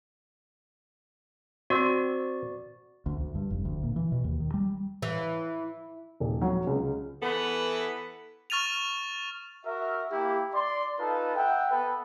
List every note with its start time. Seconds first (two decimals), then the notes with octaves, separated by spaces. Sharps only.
1.70 C4 F#4 D5
3.06 D2
3.20 D2
3.35 G2
3.51 F1
3.65 D2
3.83 A#2
3.96 E3
4.12 B2
4.24 D#2
4.40 D#3
4.54 G3
5.02 E3
6.20 D#1
6.42 F#3
6.67 C#2
7.22 E3 B3 A4 B4
8.50 C#6 F6 A6 D#7 F7
9.66 F#4 A#4 E5
10.11 A#3 E4 G4
10.54 D5 C6
10.99 D#4 F4 A4 B4 A5
11.36 E5 F#5 G5
11.71 B3 A4 B4